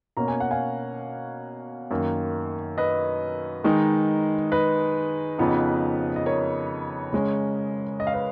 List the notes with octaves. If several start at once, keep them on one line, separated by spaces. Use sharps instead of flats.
B2 A#3 C#4 A#5
G#5
F#5
F5 G#5
F#2 D#3 A#3
B4 D#5
D#3 G#3 D#4
B4 D#5
F2 C#3 F3 B3 D#4
D#5
A#4 C#5
C#3 G#3 C#4
D#5
F5
B4 D#5